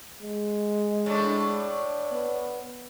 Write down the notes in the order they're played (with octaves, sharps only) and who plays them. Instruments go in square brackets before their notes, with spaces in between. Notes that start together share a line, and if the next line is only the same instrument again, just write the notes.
[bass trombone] G#3
[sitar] A2 D4
[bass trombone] B3